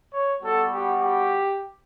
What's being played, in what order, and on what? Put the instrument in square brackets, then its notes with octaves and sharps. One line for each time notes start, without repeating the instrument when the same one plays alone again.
[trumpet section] C#5
G3 B3 F#4 A4
G4
G4